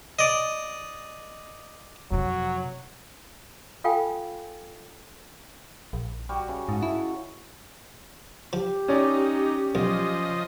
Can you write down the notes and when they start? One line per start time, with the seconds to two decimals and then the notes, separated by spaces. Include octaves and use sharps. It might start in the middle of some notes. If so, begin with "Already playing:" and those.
0.19 D5 D#5
2.11 F2 C3 F#3
3.84 F4 A4 F5 G5 G#5
5.93 A#1
6.29 G3 F#4
6.49 C#3
6.69 G#2 D#5 F#5 A5
6.83 E4
8.53 F3 G4
8.88 C#4 D#4 C#5 D5
9.75 B1 F3 D#5